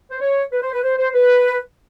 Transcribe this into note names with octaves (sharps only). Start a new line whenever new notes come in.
C5
C#5
B4
C5
B4
C5
C5
B4